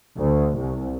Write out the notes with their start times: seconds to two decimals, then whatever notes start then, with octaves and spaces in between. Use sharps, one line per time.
0.18 D2
0.58 C2